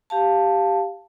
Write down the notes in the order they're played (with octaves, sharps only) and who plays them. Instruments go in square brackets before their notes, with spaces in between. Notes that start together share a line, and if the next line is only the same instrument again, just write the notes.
[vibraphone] G4 F5 A5